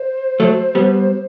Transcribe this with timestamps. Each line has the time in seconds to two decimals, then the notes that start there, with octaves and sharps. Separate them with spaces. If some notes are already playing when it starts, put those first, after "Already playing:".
Already playing: C5
0.40 F#3 A3
0.75 G3 B3